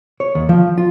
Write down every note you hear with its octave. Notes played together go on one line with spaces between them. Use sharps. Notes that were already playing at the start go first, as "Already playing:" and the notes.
C#5
D#2
F3
F4